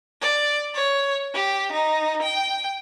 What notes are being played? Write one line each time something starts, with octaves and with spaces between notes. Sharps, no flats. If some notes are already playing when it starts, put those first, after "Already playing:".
D5
C#5
G4
D#4
G5